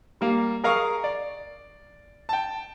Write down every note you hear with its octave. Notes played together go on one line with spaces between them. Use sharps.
G3 A#3 F5
G#4 A#4 F5 A#5 C#6 D#6
D5
G5 A5